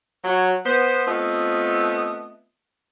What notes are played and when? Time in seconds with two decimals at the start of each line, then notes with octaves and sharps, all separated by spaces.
0.24 F#3 F#4 C#5
0.65 B3 C5
1.07 A3 B3 C4 F4 D#5